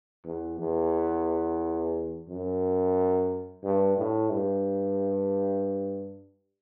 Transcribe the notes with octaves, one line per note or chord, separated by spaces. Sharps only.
E2
E2
F#2
G2
A2
G2